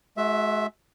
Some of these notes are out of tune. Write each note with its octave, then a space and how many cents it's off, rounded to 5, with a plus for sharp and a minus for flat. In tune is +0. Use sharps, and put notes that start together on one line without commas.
G#3 +40 F#4 +0 E5 +0